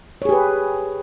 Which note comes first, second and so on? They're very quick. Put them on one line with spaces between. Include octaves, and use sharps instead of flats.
C#5 G#4 G4 B4